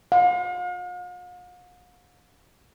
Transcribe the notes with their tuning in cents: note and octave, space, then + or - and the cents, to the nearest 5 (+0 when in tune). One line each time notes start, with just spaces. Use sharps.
F5 +45